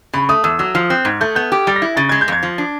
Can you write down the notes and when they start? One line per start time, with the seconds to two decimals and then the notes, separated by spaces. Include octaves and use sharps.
0.13 C#3 B5
0.29 A3 D#6
0.44 E2 E6
0.59 F#3 E6
0.75 F3 F6
0.90 C4 F#6
1.05 G#2 G#6
1.21 A3 G6
1.35 B3 G6
1.52 G4
1.67 G3 A6
1.76 A#6
1.82 E4
1.97 C#3 A6
2.09 G#3 G#6
2.21 G6
2.28 F2 G#6
2.43 F3
2.58 D4